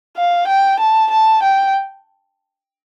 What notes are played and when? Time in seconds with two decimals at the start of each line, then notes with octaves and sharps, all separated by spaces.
0.17 F5
0.48 G5
0.80 A5
1.11 A5
1.43 G5